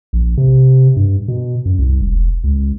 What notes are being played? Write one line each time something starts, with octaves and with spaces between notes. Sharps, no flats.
A#1
C3
G2
B2
F#2
C2
E1
C#2